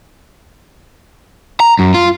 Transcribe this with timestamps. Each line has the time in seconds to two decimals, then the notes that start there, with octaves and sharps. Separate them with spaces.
1.60 A#5
1.79 F#2
1.94 F4